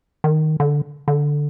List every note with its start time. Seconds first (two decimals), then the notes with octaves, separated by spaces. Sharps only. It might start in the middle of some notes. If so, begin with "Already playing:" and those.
0.24 D#3
0.60 D3
1.08 D3